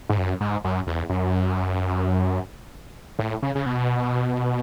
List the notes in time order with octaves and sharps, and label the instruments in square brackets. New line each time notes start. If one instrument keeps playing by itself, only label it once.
[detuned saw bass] G#2
F#2
G#2
F#2
E2
F#2
A2
C#3
C#3
B2